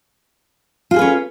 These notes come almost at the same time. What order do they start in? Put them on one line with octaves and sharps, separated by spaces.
F4 F#4 G#4 B4 C#4